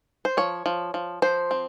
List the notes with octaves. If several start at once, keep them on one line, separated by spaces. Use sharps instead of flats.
C5
F3 C#5
F3
F3
F3 C5
C4